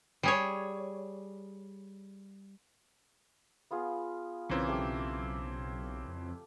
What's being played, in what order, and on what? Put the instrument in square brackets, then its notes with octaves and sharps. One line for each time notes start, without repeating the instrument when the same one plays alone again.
[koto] G3 G#4 C#5
[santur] B3 F4 G#4
[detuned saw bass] B1 [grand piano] C#3 E3 C4 [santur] A#4 D6
[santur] A3 G4 A4
[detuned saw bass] F2